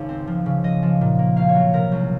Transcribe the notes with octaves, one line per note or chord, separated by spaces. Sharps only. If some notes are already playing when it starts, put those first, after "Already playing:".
Already playing: G#1 C#2
C4
F3
C#3
F3 D#5
F3
A#2
A#3
C2 F5
C#5
F#3
C3 A#4
C2